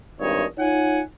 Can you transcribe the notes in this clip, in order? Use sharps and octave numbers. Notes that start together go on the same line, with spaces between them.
G#1 G2 A#2 C#5 D#5
D#4 F4 C#5 F#5 G#5